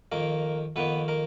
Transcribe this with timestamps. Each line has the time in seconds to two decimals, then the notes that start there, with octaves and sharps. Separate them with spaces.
0.12 F2 D#3 A#3 A#4
0.76 F2 D#3 A#3 B3 B4
1.08 A#3 A#4